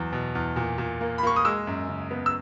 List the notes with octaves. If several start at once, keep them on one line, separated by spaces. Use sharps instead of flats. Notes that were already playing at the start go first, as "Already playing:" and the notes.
Already playing: E2 F#3
B2
E2
A#2
A#2
A#3
B5
A#3 C#6
D#6
G#3 E6
F#2
C#3
B3
E6